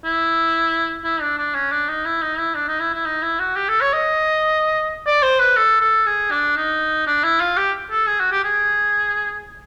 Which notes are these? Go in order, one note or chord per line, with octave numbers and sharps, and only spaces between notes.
E4
E4
D4
D4
C#4
D4
D#4
E4
D#4
E4
D4
D#4
E4
E4
D#4
E4
F#4
G4
A4
C#5
D#5
D5
C5
B4
A4
A4
G#4
D4
D#4
D4
E4
F4
G4
A4
G#4
F#4
G4
G#4